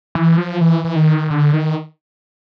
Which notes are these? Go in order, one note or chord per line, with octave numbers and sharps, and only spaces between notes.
E3
F3
E3
E3
D#3
D3
D#3